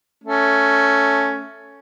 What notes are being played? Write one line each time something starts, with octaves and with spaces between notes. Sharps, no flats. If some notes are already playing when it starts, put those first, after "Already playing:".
A3 C#4